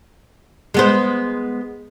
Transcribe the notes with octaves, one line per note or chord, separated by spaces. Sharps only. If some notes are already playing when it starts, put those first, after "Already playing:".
G#3 B3 C5